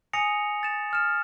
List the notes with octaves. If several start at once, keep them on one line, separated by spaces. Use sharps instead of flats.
G#5 D#6 A#6 C#7 F7
A6 E7
D#6 F6 E7